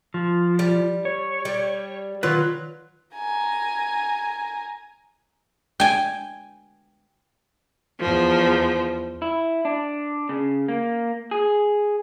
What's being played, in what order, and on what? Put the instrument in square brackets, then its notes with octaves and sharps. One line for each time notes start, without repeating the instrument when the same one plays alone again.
[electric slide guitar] F3
[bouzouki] G3
[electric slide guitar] C#5
[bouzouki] G3
[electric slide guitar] D#3 F4 B4 [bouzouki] F#3
[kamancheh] G#5 A#5
[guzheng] G5 G#5
[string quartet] E2 F3
[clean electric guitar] E4
D4
C#3
A#3
G#4